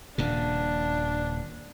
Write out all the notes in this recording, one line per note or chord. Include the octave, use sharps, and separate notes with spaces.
D#1 A#2 C#3 D4